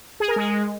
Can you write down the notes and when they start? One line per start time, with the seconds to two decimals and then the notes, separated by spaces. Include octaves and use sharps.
0.20 G#4
0.28 A#4
0.36 G#3